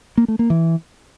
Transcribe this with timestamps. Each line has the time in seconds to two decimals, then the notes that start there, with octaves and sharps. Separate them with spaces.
0.18 A#3
0.28 A3
0.39 A#3
0.50 E3